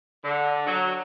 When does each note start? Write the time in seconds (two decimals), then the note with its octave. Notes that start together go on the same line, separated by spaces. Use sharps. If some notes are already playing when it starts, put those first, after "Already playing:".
0.24 D3
0.67 F#3